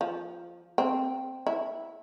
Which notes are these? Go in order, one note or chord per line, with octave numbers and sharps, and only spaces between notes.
F3
C4
E4